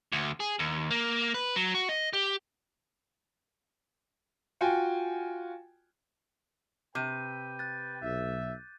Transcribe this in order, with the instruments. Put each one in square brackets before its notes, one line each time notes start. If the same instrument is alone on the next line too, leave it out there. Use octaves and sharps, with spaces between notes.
[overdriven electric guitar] D2
G#4
D#2
A#3
B4
F#3
F#4
D#5
G4
[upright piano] F4 F#4 G5 G#5
[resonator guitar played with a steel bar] C3 [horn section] B4 G5 [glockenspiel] D6 G6 D#7
[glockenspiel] F#6 A6
[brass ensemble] B1 [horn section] E5